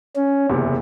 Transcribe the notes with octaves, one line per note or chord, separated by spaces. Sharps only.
C#4
F#1 E2 C3